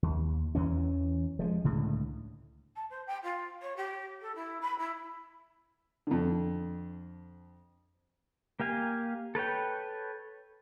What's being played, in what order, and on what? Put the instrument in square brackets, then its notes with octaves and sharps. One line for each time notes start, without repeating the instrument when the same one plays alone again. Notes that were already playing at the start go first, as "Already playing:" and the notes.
[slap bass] D#2
E2 E3 C#4
F3 G3 G#3
C#2 A2 D3
[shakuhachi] A5
C5
G5
F4
C#5
G4
A4
E4
B5
E4
[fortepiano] F2 D3
[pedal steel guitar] A#3 G4 F5 G#5
A4 B4 C#5 G5